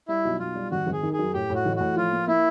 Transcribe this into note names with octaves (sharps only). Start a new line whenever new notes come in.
G3 E4
B1
B1 F4
G3
G#1 F#4
G#1
G#4
D#3
G#4
F#2
A2 G4
A2 F#4
A1
A2 F#4
F3 F4
A#3
A#3 E4